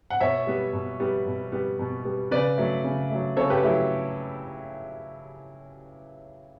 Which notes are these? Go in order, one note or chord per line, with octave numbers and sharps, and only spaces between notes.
F#5
B2 C#5 E5
G3 B3
B2
G3 B3
B2
G3 B3
B2
G3 B3
C#3 B4 D5
F#3 A3
C#3
F#3 A3
C#3 A4 C#5
G4 B4
F#3 A3 E4 G4